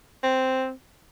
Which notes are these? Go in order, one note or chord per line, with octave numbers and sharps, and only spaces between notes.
C4